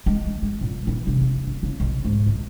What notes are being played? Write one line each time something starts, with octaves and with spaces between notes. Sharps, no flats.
G#3
G#3
A#2
E3
C3
A#3
D3
C#3
B1
G#2
C#2